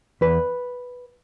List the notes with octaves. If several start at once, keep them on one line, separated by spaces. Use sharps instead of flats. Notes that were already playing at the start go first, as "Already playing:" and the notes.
E2 B4